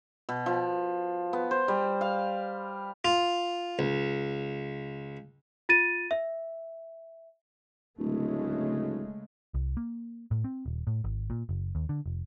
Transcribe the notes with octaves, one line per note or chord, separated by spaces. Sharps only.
B2
F3
B3
C5
G3
F5
F4
C#2
F4 A6 D#7
E5
D1 C#3 G#3 A3
C2
A#3
A2
C4
D#1
A2
G#1
A#2
F#1
D#2
D3
F1